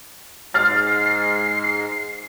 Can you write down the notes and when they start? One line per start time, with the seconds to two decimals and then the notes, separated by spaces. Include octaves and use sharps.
0.54 G#2 G#3 F6 A6 C7